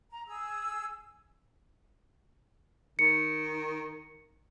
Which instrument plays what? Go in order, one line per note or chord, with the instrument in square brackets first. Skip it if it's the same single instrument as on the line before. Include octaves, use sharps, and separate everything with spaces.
[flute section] A#5
G#4 E6
[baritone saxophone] D#3 [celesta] C#7